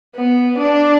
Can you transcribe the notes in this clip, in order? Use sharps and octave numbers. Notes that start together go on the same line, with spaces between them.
B3
D4